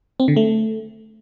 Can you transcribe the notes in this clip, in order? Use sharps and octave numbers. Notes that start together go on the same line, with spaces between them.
C4
D3
A3